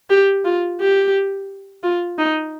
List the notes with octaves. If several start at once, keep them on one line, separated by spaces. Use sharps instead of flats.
G4
F4
G4
F4
D#4